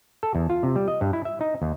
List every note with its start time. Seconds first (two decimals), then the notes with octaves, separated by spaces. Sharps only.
0.23 A4
0.35 E2
0.50 F4
0.63 C3
0.76 G3
0.88 D#5
1.01 G2
1.13 E4
1.25 E5
1.41 D#4
1.62 D#2